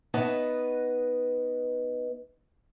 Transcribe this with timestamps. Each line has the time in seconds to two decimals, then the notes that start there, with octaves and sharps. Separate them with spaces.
0.14 B3 D#4 B4 C#5 D#5 A5